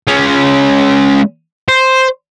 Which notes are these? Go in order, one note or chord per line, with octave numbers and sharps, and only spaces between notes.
G#3 C#4
C5